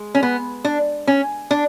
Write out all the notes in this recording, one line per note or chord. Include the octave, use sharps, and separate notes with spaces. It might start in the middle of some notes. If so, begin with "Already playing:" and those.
Already playing: G#3
C#4
B3
D4
C#4
D4